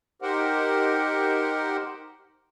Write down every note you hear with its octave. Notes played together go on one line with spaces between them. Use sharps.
D#4 G4 A#4 C5 F#5